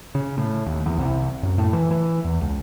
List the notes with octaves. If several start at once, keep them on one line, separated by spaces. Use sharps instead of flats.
C#3
A2
D#2
E2
C2
F#2
A2
E3
E3
E2
C#2